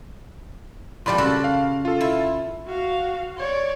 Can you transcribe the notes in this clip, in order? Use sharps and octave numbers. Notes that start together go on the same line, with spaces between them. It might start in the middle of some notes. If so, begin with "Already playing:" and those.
A#2 F3 G3 D5 B5 C6
C#3 F#4 A4
F5
F4 A4
E4
F#4 F5
C#5 D5